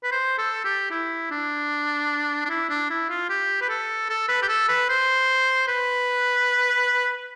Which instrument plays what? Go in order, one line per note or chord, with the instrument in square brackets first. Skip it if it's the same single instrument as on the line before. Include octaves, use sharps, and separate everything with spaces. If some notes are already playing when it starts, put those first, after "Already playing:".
[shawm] B4
C5
A4
G4
E4
D4
D4
E4
D4
E4
F4
G4
B4
A4
A4
B4
G4
A4
B4
C5
B4